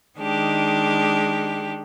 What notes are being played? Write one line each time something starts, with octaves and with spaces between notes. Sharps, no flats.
D#3 G#3 D4 G4